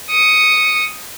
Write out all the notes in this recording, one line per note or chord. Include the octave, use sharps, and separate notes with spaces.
D#6 C#7